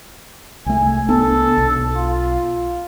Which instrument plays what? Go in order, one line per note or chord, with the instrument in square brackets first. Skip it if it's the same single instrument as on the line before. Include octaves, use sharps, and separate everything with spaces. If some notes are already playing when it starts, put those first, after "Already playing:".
[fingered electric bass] C2 A3 [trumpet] G#5
[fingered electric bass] C2 B3 D4 [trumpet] A4
[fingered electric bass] B1
[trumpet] F4